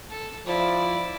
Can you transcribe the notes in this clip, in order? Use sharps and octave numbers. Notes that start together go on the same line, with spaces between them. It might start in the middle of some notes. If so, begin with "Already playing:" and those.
A4
F3 E4 D5